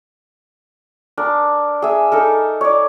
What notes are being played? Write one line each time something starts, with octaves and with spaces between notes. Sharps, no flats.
D4 A#4
G#4 E5
D#4 A4 A#4
C#5 D5